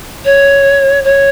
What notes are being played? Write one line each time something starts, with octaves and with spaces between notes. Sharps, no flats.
C#5
C#5